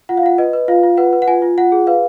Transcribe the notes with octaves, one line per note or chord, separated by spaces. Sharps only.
F4 F#5
F5
F4 F#5
B4 D#5
B4
F4 F5
F4
B4 F#5
B4
F#5
F4 G#5
F4
F4 F#5
G#4
B4 F5